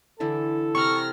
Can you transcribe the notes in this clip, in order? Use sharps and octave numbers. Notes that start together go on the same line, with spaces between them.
D3 E3 E4 A4
C3 F#5 A#5 C#6 F6 A#6